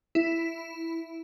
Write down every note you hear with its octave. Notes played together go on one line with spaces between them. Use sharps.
E4